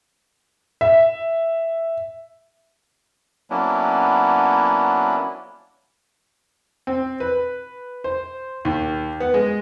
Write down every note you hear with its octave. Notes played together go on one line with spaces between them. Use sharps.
E5
F#3 A#3 B3 C#4 D4 E4
C4
B4
C5
D#2
B3
G#3